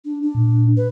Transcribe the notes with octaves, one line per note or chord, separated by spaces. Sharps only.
D4
D4
A#2
B4